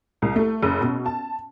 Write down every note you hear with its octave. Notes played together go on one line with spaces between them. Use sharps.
C2
A3
F#1
B2
A5